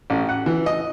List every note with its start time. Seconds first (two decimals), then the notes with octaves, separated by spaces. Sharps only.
0.10 A1
0.29 F#5
0.46 E3
0.66 D#5